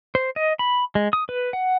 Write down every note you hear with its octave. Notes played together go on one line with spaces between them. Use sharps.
C5
D#5
B5
G#3
D#6
B4
F#5